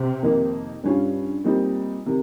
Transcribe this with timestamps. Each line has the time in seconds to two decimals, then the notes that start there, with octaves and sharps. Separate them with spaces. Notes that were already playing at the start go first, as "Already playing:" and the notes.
Already playing: C3
0.22 F2 D#3 A#3 D#4
0.84 G2 G3 C#4 F4
1.44 A#2 G3 C4 D#4
2.06 C3 D#3